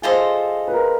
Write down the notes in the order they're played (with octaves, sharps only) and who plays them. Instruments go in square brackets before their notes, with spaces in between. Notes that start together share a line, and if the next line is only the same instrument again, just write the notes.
[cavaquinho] F4 A4 C5 D#5 [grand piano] G#4
[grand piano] B4
A#4